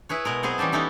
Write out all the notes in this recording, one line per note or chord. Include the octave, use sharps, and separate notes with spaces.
E4 G#4 B4 C#5
B2 G#3 A#4
F#3 B3 C4 G#4
E3 G3 C#4 G4 A5
B3 C#4 D#4 E4 A4